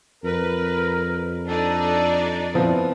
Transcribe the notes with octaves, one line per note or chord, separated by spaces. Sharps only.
F2 A#4 B4
D4 D#4 A4 D5
F3 B3 C4 E4